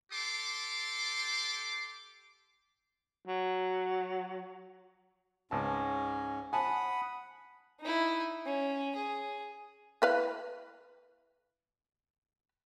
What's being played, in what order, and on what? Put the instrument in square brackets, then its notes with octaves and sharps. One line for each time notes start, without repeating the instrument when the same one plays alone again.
[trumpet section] G4 A4 C6 D6
[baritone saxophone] F#3
[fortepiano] C#2 A5 [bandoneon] G#2 C#4
[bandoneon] F#5 B5 D#6 [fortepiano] G#5 A5
[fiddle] D#4 E4
C#4
G#4
[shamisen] E4 B4 F5